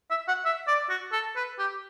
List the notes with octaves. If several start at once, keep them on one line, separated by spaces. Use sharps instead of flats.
E5
F#5
E5
D5
F#4
A4
B4
G4